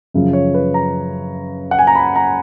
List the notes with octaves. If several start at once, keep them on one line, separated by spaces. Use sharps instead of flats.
F#2 C#3 F3
C#5
B4
A#5
F#5
G#5
A#5
B5
A#5